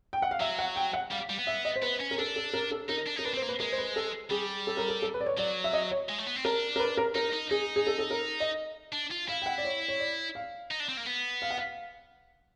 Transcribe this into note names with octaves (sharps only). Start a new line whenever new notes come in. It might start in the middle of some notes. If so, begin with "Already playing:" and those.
G5
F#5
F5
F#3 E5
F#5
G5
F#5
G3 F5
G3
B3
E5
D#5
C5
B3 B4
C#4
A#4
D4 A4
A4
A#4
A4
D#4 A#4
D4
D#4 A#4
D4 B4
C4 C5
A#3
B4
G#3 A#4
C5
B4
A4
G3 G#4
A4
A#4
A4
A4
B4
D5
C#5
F#3 D5
E5
D#5
C#5
G#3
A3
B3
C4
D4 A#4
A#4
B4
A#4
D#4 A#4
D#4
D#4 G#4
G#4
A4
A4
A#4
D#5
D4
F4
E4 F5
G5
F#5
D5
C#5
C#5
D5
F5
D#4
D4
C4
A#3
B3
F5
F#5
F5